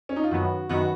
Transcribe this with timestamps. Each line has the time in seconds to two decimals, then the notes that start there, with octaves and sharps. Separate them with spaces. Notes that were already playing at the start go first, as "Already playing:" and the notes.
0.09 C#4
0.16 D#4
0.24 F4
0.31 F#2 D#3 F#3 B3 F#4
0.69 F#2 D#3 F#3 B3 F#4